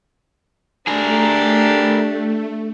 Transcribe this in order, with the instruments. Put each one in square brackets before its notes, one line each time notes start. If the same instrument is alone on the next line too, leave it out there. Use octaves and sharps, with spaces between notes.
[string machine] A3 [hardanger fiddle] D4 G4 [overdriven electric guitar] G#4 A#4